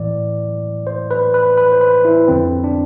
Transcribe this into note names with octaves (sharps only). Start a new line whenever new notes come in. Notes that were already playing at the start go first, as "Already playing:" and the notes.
Already playing: A2 E3 D5
C5
B4
B4
B4
C5
B4
E4
F2 D3 C4
D4